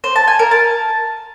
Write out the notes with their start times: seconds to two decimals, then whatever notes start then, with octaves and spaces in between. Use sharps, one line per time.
0.04 C5
0.16 A5
0.27 G#5
0.39 A#4
0.51 A5